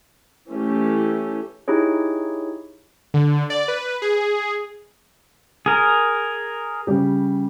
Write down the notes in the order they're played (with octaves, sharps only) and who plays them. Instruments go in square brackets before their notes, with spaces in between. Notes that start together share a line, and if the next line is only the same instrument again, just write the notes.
[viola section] E3 A3 C#4 G4
[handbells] D#4 E4 G4 G#4 C#5
[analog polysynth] D3
D5
B4
G#4
[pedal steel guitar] G#4 A#4
[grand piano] C#3 G3 G4